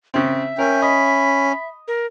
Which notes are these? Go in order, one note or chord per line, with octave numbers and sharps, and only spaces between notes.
C#3 C4 E5
C#4 A#4 G5
D#5 B5
A#4